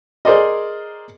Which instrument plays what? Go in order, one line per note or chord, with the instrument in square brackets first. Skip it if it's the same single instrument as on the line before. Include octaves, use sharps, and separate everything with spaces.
[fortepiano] G#4 A#4 C5 D5 D#5